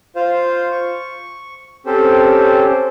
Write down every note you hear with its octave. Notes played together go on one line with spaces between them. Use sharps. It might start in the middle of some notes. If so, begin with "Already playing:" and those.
F4 C5 F5
C#6
C4 C#4 G4 A4 C5